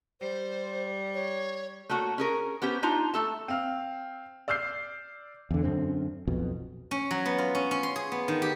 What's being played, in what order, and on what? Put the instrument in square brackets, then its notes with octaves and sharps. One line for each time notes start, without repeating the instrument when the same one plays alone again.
[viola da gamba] G3 [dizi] C5
[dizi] C#5
[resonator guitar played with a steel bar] A3 A#3 F#4 C#5
C#4 G#4 A#4
B3 C#4 G4 C5
D4 D#4 F4 A#5
A3 A4 A5
[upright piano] C4 F5
D5 E6 F6 G6 C7
[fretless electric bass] E2 D3
F#2 D3 C4
B1 F2 B2
[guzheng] C#4
F#3
B3
F4
C#4
C#4
C6
G#4
B3
D#3
G4